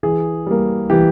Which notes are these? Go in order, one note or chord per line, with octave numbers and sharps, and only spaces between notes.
E3 G#4
G3 A#3
E3 G4